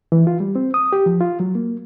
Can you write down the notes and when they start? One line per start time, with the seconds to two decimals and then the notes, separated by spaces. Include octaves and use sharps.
0.12 E3
0.27 F4
0.40 G3
0.56 C4
0.74 D#6
0.93 G4
1.06 F3
1.21 F4
1.40 F#3
1.55 A#3